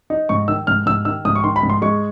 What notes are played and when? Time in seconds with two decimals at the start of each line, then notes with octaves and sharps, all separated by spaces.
0.10 D#4
0.29 G#2 C#6
0.48 D#3 E6
0.67 G#2 F6
0.86 G#2 E6
1.05 D#3 E6
1.25 G#2 D#6
1.35 C#6
1.44 D#3 C6
1.56 B5
1.63 G#2
1.70 C6
1.82 G#3 C#6